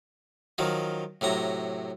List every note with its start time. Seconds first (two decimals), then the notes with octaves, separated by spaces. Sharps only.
0.58 D#3 F3 F#3
1.21 A2 C3 F#3 A#5